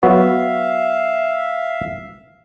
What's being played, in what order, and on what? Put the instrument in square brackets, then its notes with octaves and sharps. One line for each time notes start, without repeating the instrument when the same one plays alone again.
[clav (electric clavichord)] F#3 B3 F#4 [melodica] E5 F5